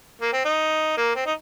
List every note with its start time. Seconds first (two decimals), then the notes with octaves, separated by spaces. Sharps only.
0.22 A#3
0.33 C4
0.45 D#4
0.97 A#3
1.16 C4
1.26 D#4